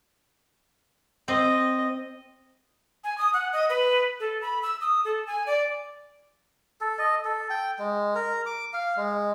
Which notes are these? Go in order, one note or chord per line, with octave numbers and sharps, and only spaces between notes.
C4 D#5
G#5
D#6
F#5
D#5
B4
A4
B5
E6
D#6
A4
G#5
D5
A4
D#5
A4
G5
G#3
A#4
D6
F5
G#3